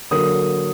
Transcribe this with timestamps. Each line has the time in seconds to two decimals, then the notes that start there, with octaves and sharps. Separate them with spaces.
0.11 D3 F#3 A#3 D#6